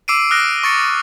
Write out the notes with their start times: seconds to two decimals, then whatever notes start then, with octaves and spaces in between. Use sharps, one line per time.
0.08 D6 E6 C7 D7 D#7
0.31 D#6 F6 F#6 A#6 D7
0.63 C#6 A6 C#7